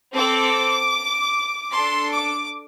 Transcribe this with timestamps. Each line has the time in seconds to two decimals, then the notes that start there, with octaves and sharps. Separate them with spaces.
0.13 C4 A4 D6
1.72 D4 A4 C6
2.12 D6